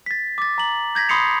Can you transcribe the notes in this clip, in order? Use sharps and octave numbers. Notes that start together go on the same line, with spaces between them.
A6 B6
D6 A6
A#5 F#7
G6 G#6 A#6 B6
B5 C6 D#6 C7 C#7 F7